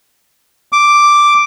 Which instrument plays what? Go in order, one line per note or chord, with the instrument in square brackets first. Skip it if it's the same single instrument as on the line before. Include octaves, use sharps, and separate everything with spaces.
[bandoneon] D6